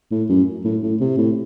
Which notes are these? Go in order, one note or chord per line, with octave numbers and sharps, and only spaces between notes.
A2
F#2
A2
A2
C3
A2